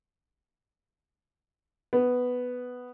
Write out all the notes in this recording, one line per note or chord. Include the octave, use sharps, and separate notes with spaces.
B3